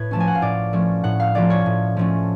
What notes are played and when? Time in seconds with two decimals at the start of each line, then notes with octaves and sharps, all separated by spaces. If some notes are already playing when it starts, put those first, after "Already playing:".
Already playing: A2 B4 C#5
0.11 F3 A3 C#4 A5
0.20 G#5
0.27 F#5
0.35 F5
0.42 A2 D5
0.73 F3 A3 C#4
1.04 A2 F#5
1.20 F5
1.35 F3 A3 C#4 D5
1.50 C#5
1.66 A2
1.97 F3 A3 C#4